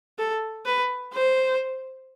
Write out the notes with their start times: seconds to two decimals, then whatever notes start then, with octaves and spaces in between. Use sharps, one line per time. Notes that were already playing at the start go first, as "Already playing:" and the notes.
0.19 A4
0.66 B4
1.13 C5